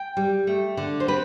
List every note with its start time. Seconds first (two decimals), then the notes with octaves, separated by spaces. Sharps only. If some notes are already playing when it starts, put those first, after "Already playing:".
Already playing: G5
0.17 G3
0.47 A3
0.77 D3
1.00 C5
1.08 C4 B4